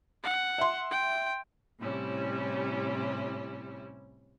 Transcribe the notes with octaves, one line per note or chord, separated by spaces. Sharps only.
F#5
E5 C6
G5
A2 C3 G3 C#4 E4